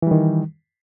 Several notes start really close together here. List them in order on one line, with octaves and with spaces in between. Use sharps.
E3 G3 D#3